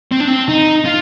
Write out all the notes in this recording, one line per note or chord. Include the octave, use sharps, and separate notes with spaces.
C4
D4
C4
D#4
F4